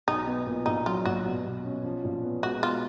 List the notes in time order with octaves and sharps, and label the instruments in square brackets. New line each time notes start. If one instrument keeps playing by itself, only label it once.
[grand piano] B1 [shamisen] D#4
[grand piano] B3
A#2
[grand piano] A#1 [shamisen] D#4
[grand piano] F#3 [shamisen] F4
[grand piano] A#1 [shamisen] F#4
[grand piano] B2
B2
C#4
F3
A#1
B3
[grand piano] G#3 [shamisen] F#4
[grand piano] B2 [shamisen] F4